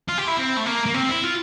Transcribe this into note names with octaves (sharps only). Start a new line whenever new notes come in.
F4
G4
E4
C4
A3
A#3
A#3
C4
E4
F4